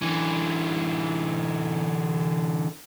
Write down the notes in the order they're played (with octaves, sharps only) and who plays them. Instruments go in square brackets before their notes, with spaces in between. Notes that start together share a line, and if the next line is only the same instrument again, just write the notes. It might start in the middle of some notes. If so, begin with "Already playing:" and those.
[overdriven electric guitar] D3 E3